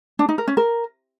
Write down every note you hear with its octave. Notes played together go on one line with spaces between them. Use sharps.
D4
D#4
A#4
C#4
A#4